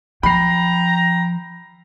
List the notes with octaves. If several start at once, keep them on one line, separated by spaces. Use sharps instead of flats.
F3 G5 A#5 B5 C7